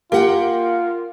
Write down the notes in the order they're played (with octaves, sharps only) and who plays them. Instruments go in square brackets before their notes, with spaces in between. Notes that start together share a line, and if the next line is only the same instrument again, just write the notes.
[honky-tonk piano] A#3 [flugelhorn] F4 [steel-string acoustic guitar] G4 F#5 G5